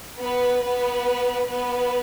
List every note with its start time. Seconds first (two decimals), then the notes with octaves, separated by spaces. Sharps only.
0.21 B3 B4
0.63 B3 B4
1.48 B3 B4